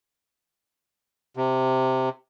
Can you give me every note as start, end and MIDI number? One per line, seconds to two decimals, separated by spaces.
1.36 2.09 48